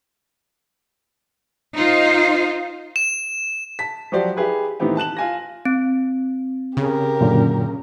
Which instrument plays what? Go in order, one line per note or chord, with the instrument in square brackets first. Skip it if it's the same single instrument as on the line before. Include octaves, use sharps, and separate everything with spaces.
[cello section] D#4 F4 C5
[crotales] E7
[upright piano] A5 B6
F3 F#3 F#4 G4 C5 D5
E4 G4 G#4 B4
A2 D#3 E3 B3 C4 G4
A5 F#6 E7 F#7
F4 G#5 A#6
[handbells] C4
[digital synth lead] C#3 [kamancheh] G4 A#4
[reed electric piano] F#2 A#2 D3